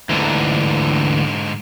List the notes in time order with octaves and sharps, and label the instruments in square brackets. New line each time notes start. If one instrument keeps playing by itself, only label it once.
[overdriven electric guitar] D2 E3 [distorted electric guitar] G#2 D3